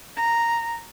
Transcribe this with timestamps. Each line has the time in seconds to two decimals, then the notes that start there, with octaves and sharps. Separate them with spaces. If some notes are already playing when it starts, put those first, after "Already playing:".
0.17 A#5